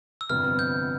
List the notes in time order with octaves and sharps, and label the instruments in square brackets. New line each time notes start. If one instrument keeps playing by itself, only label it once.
[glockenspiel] E6
[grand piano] G1 F2 C3 G3 B3 [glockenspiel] F6
[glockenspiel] G6